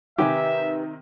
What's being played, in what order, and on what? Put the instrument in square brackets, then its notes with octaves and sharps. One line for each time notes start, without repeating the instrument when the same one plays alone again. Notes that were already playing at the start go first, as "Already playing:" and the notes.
[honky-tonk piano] C3 D#3 D#4 [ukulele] G4 B4 G#5 [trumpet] E5